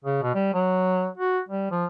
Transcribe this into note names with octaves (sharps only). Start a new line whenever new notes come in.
C#3
B2
G3
F#3
F#4
G3
F3